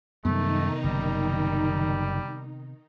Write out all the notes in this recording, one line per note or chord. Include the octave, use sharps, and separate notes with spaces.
F#2 C3 D#3 G3 A3 B3 D#4
F#1 G3